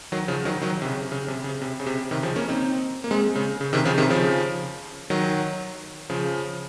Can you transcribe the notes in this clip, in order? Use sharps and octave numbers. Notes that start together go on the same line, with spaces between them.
D#3 F#3
C#3 F3
D#3 F#3
D#3 F#3
C3
C#3
C#3
C3
C#3
C3
C#3
C3
C3 D#3
C#3 F3
A#3 C#4
C4 D#4
A#3
G#3 C4
C#3
C#3
C3 D#3
C#3 F3
C3 D#3
C#3 F3
D#3 F#3
C#3 F3